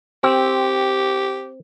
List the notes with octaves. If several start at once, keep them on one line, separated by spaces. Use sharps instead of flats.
C4 G4